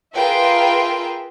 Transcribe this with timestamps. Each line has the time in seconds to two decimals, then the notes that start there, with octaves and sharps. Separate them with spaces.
0.16 F4 G#4 A#4 B4 E5 G5